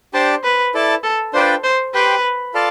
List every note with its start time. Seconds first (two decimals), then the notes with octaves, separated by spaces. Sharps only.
0.14 D4 G4 C5 D5 A5
0.44 B4
0.74 E4 A4 D5 A5
1.04 A4
1.34 D4 F4 B4 C5 D5 G5
1.64 C5
1.94 G4 B4 C5 G5
2.54 F4 A4 D5 F5 A5